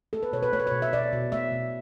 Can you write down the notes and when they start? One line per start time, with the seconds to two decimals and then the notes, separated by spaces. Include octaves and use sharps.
0.13 A3 A4
0.23 B4
0.33 B2 C#5
0.43 B4
0.53 A3 C#5
0.59 B4
0.67 C#5
0.72 B2
0.82 E5
0.93 B2 D5
1.13 B2
1.32 A3 E5
1.52 B2